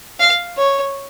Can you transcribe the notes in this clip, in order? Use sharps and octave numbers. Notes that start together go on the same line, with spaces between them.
F5
C#5